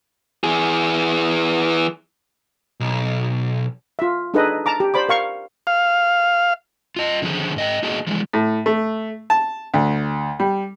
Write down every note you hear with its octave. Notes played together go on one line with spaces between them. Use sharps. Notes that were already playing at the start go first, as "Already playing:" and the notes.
E3 G#4
B1
F4 E5
D4 D#4 G#4 A4 B4 D#5
A5 A#5 D6
G4
C5 D5 B5 D6
A#4 F5 C#6
F5
F4 D#5
D3 D#3 F3 G#4 C5
G#2 D#5 G5
A#3 D#4 F#4 G#4 D#5 A5
E3 F3 G#3
A2
A3
A5
D2
G3